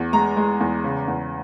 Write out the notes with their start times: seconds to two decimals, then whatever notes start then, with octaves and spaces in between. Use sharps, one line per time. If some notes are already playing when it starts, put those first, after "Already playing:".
Already playing: E2
0.13 G#3 A#5
0.37 G#3
0.61 E2
0.84 C#3
1.08 E2